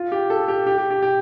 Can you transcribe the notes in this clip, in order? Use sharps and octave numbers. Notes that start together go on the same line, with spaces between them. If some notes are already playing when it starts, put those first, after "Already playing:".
Already playing: F4
G4
A4
G4
G4
G4
G4
G4